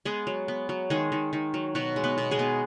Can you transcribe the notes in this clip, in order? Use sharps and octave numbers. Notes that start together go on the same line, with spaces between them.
G#3 B3 G#4
F#3
B3
F#3
D#3 G#3 G#4
D#3
D#3
F#3
B2 F#3 F#4
G#3
B3 B4
B2
G#3 G#4
B3